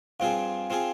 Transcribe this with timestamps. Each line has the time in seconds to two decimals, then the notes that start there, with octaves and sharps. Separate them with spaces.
0.20 G2 F3 C4 F4 G#4 F5
0.70 F3 C4 F4 G#4